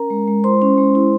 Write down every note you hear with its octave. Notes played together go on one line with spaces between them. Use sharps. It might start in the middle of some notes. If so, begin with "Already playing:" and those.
Already playing: C#4 A#4 A#5
G#3
G#3
E4 C5 C6
C#4
G#3
E4